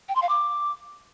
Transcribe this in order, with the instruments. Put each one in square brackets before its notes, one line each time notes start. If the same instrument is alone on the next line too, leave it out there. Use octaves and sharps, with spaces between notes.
[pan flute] G5
C6
F5
D6